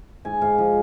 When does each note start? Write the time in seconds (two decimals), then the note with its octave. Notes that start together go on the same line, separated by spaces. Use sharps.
0.25 G#2 G#5
0.41 G#2 F5
0.58 F3